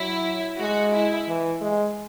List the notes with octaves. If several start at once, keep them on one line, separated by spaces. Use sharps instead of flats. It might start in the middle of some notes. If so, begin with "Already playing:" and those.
Already playing: F#3 E4
G#3 F#4
E4
E3
G#3